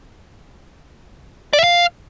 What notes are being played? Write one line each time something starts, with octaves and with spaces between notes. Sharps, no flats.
D5
E5
F5